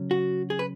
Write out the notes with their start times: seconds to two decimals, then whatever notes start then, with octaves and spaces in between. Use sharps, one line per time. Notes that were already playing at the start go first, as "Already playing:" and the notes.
Already playing: C#3 F#3 C#4
0.11 F#4
0.50 G#4
0.59 B4